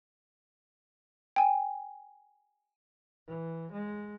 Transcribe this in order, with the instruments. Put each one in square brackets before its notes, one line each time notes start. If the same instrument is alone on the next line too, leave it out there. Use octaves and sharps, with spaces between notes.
[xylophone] G5 G#5
[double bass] E3
G#3